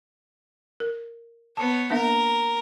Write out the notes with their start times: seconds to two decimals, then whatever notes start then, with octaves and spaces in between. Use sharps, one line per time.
0.80 A#4
1.57 B3 C#5 A5
1.90 A#3 D4 A#4 E5